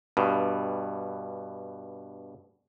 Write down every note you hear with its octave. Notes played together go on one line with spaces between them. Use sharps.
G2 B2